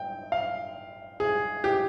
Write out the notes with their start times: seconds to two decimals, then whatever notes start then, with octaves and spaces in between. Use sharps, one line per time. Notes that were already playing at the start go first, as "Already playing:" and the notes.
Already playing: G5
0.32 F5
1.20 G#4
1.64 G4